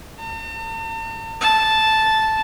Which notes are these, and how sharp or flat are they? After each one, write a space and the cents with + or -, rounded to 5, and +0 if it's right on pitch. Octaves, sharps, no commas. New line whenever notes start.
A5 +45
A5 -5